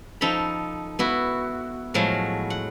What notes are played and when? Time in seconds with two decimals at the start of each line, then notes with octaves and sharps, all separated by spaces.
0.21 F3 D#4 A4 A#5 B5
0.99 B3 E4 F#4
1.94 A2 F3 F#3 G#3
2.50 F#5